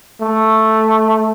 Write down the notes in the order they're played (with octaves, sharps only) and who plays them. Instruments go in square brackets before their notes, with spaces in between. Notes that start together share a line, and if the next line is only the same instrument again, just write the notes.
[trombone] A3